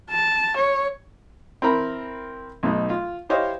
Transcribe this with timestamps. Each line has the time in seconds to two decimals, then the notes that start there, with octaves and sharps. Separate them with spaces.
0.10 A5
0.57 C#5
1.62 C4 E4 A#4 A#5 B5
2.63 B1 B2 A3 D#4
2.90 F4
3.29 E4 G4 C5 C#5 D#5 F5